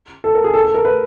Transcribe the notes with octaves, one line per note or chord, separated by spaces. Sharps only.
A4
A#4
G#4
A4
A4
A#4
B4